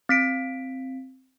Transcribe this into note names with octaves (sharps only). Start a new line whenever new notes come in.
C4 B6 D7